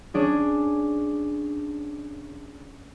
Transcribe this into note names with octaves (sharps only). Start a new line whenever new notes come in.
C#4 D4 G#4